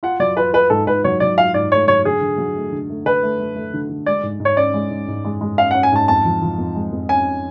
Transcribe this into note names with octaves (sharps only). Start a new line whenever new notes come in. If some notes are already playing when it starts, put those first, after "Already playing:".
F4 F#5
F#3 D5
F4 B4
F4 B4
G#2 A4
G#2 B4
F#3 C#5
F#3 D5
F4 F5
G#2 D5
A3 C#5
F#3 C#5
D3 G#4
D3
F#3
A3
D3
A3
D3 B4
A3
A3
A3
D3
D3
G#3 D5
G#2
G#2
C#5
C#4 D5
G#3
G#2
G#2
G#3
G#3
C#4 F5
F#5
C#4
G#5
G#2 A5
F2 A5
F3
F3
F2
G#3
F2
C#4 G#5